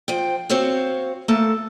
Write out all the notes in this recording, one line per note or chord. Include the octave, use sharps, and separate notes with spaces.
F3 C5 G5
C4 F#4 C5 C#5 F5
A3 A#3 A4